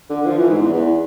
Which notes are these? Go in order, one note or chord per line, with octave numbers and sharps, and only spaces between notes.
D3
F3
E3
G#2
E2
E2